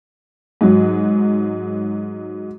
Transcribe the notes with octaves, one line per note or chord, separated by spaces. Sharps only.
G#2 F#3